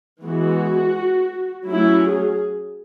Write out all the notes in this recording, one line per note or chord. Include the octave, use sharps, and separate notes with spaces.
E3 G#3 B3 F#4
F#3 A3 C#4 E4
G#4